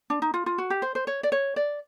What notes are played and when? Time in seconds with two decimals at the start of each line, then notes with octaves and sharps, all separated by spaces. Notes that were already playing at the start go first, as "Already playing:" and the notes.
0.10 D4
0.22 D#4
0.34 F4
0.46 F4
0.58 F#4
0.70 G4
0.82 C5
0.95 C5
1.07 C#5
1.23 D5
1.32 C#5
1.56 D5